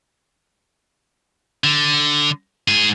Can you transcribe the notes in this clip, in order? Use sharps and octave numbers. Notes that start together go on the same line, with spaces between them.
D3
G#2 G#4